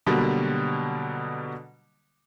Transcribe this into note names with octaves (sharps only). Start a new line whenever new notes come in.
B2 D3 F#3 G3 A#3